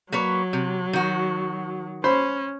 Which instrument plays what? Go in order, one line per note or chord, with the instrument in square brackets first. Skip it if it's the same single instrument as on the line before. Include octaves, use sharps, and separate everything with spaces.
[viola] F#3 [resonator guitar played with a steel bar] A#3 B4 C#5
[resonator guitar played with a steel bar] C3
D#3 F#4
[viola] C#4 [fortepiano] C5 B5 C6